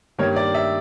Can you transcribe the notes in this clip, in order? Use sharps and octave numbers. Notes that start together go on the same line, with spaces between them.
G2 D#3 G3 A#3 C#5
D5
E5